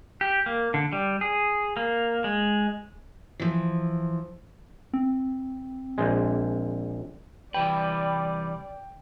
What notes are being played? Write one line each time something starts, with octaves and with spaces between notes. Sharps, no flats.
G4
A#3
D3
G3
G#4
A#3
G#3
E3 F3
C4
A#1 G#3
C3 E3 G3 B4 D5 G5